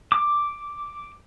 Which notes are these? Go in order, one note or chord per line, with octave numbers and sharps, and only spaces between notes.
D6